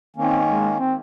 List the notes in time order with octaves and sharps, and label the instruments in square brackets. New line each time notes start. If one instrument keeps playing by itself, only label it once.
[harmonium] D#3 A#3 C#4 [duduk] C4
[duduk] G#3
C4